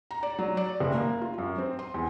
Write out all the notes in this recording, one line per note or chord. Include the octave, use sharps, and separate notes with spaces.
A#5
D5
F#3
D5
F#1
A#3
F4
F#2
C4
C6
E2